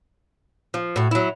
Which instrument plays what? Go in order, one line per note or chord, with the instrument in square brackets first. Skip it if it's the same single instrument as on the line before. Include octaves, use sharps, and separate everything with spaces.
[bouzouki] F3
A2 F#4
F#3 E4